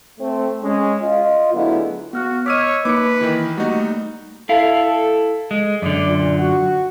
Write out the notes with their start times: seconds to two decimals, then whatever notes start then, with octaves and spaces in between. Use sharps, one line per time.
0.20 A3 C4
0.63 G#3 C#4
1.02 F4 D#5
1.54 D3 F#3 A3 B3 E4 G#4
2.13 B3 F#4 F6 F#6
2.46 C#5 D#5 D6 E6 F6 B6 D#7
2.85 A#3 D#4 B4 D6 C#7
3.21 D#3 E3
3.57 G3 A3 A#3 D#4 F#4
4.49 E4 A4 F5
5.51 G#3
5.82 F#2 D3 D5
6.07 A#2
6.38 F#4 F#5